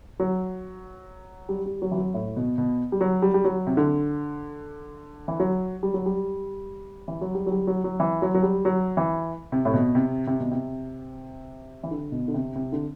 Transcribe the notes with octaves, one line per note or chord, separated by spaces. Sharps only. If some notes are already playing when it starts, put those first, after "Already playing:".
F#3
G3
G3
F#3
E3
F#3
A2
B2
B2
G3
F#3
G3
G3
F#3
C3
D3
E3
F#3
G3
F#3
G3
E3
F#3
G3
F#3
G3
F#3
F#3
E3
F#3
F#3
G3
F#3
E3
C3
A2
B2
C3
C3
B2
C3
E3
D3
B2
D3
C3
C3
D3